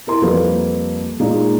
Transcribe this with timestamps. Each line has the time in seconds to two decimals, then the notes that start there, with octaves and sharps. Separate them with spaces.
0.07 E4 A#4 C6
0.22 F2 G3 A#3 A4 B4
1.20 A#2 G#3 A#3 D#4 F4